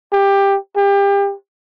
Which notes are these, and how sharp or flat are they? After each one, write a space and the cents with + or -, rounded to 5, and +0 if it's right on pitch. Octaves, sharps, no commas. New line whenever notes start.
G4 +15
G4 +30